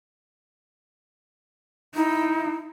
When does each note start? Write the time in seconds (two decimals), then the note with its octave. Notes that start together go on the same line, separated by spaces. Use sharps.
1.95 D#4 E4